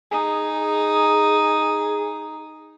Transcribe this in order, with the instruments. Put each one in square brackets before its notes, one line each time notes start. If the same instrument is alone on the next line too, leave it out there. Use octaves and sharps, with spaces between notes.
[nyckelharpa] D#4 [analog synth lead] G#4